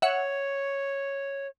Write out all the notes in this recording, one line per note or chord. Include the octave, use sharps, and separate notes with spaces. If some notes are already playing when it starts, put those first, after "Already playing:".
C#5 E5 F#5 C#7